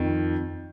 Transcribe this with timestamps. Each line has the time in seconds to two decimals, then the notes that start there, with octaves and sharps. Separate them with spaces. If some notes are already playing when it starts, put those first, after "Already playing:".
Already playing: F2 D#3